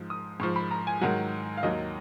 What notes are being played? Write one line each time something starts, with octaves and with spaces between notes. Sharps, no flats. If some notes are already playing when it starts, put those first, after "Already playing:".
Already playing: G#2 F3
D#6
G#2 F3 C#6
B5
A#5
G#5
G#2 D#3 F#3 F#5
F5
D#2 D#3 F#3 D#5